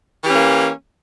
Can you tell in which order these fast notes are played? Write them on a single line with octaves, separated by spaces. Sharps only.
E3 G4 C#4 A#3